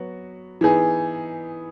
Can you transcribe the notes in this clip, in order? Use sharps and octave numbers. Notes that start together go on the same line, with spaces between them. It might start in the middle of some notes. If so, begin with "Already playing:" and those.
Already playing: F#3 B3 F#4
E3 B3 D#4 G#4